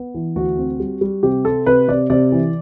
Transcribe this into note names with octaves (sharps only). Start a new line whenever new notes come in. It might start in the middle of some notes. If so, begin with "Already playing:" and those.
Already playing: B3
E3
D2 F#4
C4
G3
G3
C3 G4
C4 A4
C3 B4
C3 D5
C3 D5
E3